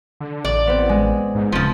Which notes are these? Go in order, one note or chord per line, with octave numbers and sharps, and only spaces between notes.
D3
A1 D5
B3 C4
G#3
G#2
D#1 C#3 F3